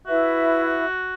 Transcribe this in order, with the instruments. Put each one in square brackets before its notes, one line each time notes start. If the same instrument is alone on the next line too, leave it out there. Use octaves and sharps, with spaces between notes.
[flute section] E4 B4 E5 [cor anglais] F#4